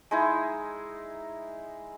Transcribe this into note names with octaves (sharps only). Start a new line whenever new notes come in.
G#3 D#4 E4